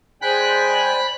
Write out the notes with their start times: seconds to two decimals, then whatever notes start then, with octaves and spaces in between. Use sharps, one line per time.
0.22 G#3 C5 D5 G5 G#5 B5 F#6